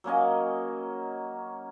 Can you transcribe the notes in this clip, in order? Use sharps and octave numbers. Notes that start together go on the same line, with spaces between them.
F#3 A#3 C#4 D#5